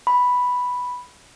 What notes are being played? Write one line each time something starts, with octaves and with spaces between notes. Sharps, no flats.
B5